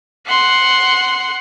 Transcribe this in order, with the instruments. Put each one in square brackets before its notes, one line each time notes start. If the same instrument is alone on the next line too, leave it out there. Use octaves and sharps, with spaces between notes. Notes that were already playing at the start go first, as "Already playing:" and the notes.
[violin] F#5 C6